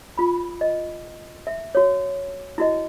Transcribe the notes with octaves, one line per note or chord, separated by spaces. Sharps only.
F4 B5
D#5
E5
F#4 C#5
E4 F#4 D#5